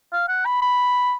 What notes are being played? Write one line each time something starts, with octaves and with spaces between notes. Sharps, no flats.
F5
F#5
B5
B5